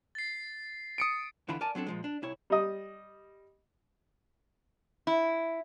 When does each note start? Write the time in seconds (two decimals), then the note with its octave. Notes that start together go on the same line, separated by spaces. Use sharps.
0.15 A6 C7
0.98 D#6 C#7 D7
1.48 E2 D3 E3 E4 F4 B5
1.61 A#4 D5 G#5 A5
1.75 F#3 C4 D4 A4
1.86 A#2 F3 G#3
2.04 D4
2.22 C2 E4 C#5
2.50 G3 D#5
5.07 E4